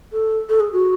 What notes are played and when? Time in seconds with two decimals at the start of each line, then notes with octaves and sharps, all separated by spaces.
0.13 A4
0.49 A4
0.60 G#4
0.73 F#4